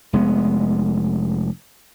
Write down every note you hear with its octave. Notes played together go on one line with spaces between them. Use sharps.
F1 G#3 B3